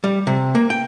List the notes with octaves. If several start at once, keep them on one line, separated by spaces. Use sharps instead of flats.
G3
C3
A#3
G5